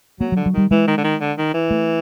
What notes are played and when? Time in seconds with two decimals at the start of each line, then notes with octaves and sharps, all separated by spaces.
0.20 F#3 A#3
0.32 F#3
0.36 D3
0.46 F#3
0.53 D#3 G3
0.71 E3 G#3
0.87 D#3
0.97 D3
1.04 D#3
1.21 D3
1.38 D#3
1.54 E3
1.71 A3